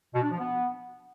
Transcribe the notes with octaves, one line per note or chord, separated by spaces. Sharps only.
B2
D4
F3
B3